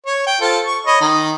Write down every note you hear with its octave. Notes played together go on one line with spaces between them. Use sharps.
C#5
G5
F4 A4 C5
C#6
C#5 D#5 B5
D#3 D#4